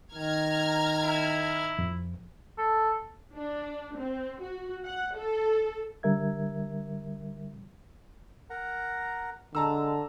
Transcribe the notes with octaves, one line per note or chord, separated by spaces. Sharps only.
D#3 A#5 F6 G#6
E4
F2
A4
D4
C4
F#4
F#5
A4
D3 G3 A#4 E5 G#6
A#4 F#5 A#5
D3 G#3 A5 A#5 E6